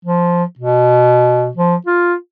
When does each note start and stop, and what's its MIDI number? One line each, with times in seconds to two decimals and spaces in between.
0.05 0.44 53
0.59 1.49 47
1.57 1.75 53
1.86 2.14 65